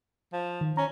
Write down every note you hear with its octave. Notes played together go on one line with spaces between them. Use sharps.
F3
D#3
C#4 A#5